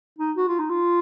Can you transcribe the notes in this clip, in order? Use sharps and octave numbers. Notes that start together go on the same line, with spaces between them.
D#4
F#4
F4
D#4
F4